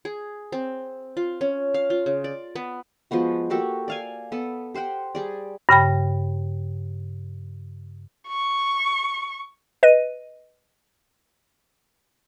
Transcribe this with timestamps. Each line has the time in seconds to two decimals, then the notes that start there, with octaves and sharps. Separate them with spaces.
0.05 G#4
0.52 C4
1.17 F4
1.41 C#4
1.74 F5
1.90 F4
2.06 C#3
2.24 D5
2.56 B3
3.11 F3 G#3 B3 F#4
3.50 A#3 F#4 G4 A4
3.88 D5 F5 G#5
4.32 B3 A4
4.74 G4 C5 F#5 G5
5.15 G3 G#4 D5
5.69 G2 C#3 G5 B5
8.28 C#6
9.83 B4 D#5 D#7